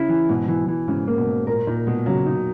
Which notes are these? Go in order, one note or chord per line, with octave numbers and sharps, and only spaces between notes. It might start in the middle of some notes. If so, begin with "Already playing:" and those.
Already playing: C#3 E4
E3
G#2 B2
E3
E3
G#2 C#3
A#3
B2
G#2
A#2 A#4
A#2 D#4
B2 G#3
C#3 F#3
D#4